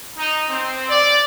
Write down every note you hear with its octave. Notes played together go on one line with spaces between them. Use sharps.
D#4
C4
D5